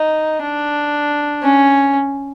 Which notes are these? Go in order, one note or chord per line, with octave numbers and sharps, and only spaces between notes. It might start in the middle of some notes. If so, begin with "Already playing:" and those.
Already playing: D#4
D4
C#4